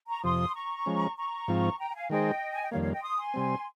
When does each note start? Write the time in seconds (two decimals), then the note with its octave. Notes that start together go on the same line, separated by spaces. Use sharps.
0.08 A#5 C#6
0.24 F2 C3 F3 C6 D#6
0.55 A#5 C#6
0.86 F3 G#3 C#4
1.17 A#5 C#6
1.48 G#2 F3 C4 F4
1.79 G5 A#5
1.90 G5
1.94 F5 G#5
2.10 D#3 G#3 D#4 G#4 C5 D#5 G5
2.53 G#5
2.63 G5
2.71 F2 D#3 G3 A#3 C#5 F5
2.82 C#5 F5
2.92 D#5 G5
3.03 C6 D#6
3.18 G#5 C6
3.34 C3 G3 C4